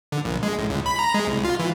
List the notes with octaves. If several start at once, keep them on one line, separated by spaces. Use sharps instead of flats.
D3
A#1
G#3
A1
C#2
B5
A#5
G#3
C2
F4
E3